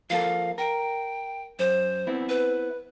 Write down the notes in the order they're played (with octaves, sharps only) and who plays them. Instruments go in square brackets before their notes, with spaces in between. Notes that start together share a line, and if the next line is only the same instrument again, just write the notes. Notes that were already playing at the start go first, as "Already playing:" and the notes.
[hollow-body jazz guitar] F3 A#3 A4 [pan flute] F5
[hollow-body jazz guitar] A#4 [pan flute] G5
[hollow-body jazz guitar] F#2 [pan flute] C5
[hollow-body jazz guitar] B3 C4 E4
[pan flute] B4